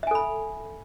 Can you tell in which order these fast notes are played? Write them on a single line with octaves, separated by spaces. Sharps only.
E5 G#5 A4 B5